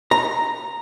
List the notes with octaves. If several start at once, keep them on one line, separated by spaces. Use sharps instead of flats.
A#5